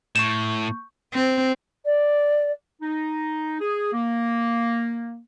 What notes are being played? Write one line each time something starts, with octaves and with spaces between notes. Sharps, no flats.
A2 C#6 G6 E7
C4
D5
D#4
G#4
A#3